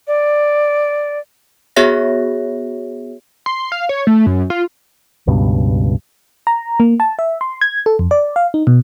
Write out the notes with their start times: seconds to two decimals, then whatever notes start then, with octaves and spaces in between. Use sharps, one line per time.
0.07 D5
1.76 B3 F#4 G#4 C#5 E5 A#6
3.46 C6
3.72 F5
3.89 C#5
4.07 A3
4.26 F#2
4.50 F4
5.27 C#2 G2 B2
6.47 A#5
6.80 A#3
7.00 A5
7.19 E5
7.41 C6
7.61 G#6
7.86 A4
7.99 F2
8.11 D5
8.36 F5
8.54 D#4
8.67 B2